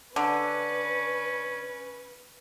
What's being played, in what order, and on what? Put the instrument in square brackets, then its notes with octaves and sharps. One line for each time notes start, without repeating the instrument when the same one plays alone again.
[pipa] D3 [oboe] C#4 [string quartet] B4